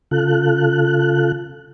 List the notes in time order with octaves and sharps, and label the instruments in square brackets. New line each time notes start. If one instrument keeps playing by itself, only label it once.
[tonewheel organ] C#3 F4 A4 F#6